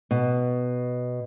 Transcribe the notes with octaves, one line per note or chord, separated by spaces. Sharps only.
B2